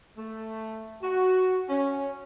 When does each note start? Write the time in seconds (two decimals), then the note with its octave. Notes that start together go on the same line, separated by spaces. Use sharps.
0.18 A3
1.03 F#4
1.69 C#4